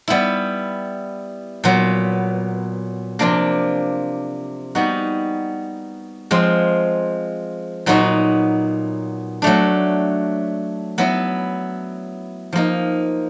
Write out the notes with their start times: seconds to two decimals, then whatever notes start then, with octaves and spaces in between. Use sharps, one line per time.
0.08 G3 B3 E4
1.64 A#2 F#3 B3
3.19 C3 F3 A#3 D4
4.75 G3 B3 D#4 F#4
6.31 F3 G#3 C4 F4
7.86 A#2 F#3 B3 D#4 F#4
9.42 F#3 A3 D4
10.98 F#3 B3 E4
12.53 F3 A#3 D#4